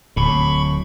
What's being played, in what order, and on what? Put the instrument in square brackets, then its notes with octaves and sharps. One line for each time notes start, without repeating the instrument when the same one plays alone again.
[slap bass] D1 A2 [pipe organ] B5 C#6